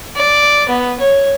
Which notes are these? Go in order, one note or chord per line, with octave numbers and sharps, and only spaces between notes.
D5
B3
C#5